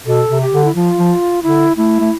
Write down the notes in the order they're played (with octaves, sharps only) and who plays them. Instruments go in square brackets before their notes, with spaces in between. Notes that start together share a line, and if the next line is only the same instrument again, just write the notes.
[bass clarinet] B2 [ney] A4
[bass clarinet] C3
[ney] G4
[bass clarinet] D3
[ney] E4
[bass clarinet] F3 [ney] F4
[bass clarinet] F3
[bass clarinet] D3 [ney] E4
[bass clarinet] A3 [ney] E4
[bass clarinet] A3